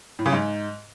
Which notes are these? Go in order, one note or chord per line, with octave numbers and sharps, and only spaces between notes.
A2
C#3
G#2